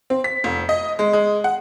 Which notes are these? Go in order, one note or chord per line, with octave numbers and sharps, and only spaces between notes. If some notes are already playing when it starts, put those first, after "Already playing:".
C4
B6
F1
D#5
G#3
G#3
F#5